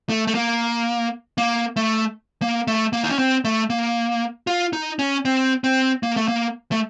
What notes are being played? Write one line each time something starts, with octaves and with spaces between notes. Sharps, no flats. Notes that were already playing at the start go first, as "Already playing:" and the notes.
A3
A3
A#3
A#3
A3
A#3
A3
A#3
D#4
C#4
C4
A3
A#3
F4
D#4
C#4
C4
C4
A#3
A3
A#3
A3